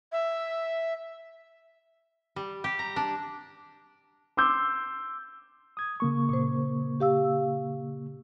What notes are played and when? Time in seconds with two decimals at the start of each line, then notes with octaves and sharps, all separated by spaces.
0.12 E5
2.36 G3
2.64 G4
2.79 A#5
2.96 D4
4.37 C6 D6 E6 G6
5.77 D#6 G#6
6.00 C#3 A#3 C#6
6.29 A#2 C5
7.00 G4 F5 E6